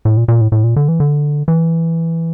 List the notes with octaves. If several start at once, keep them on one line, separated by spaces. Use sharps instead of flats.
A2
A#2
A#2
A2
A2
A#2
D3
E3
D3
E3